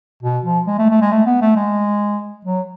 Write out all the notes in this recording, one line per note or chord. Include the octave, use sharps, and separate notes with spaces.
B2
F3
G#3
A3
A3
G#3
A3
B3
A3
G#3
F#3